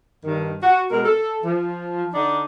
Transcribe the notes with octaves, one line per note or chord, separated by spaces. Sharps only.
G2 D#3
F#4
B2 G#3 A#4
A4
F3
D3 D4 D#4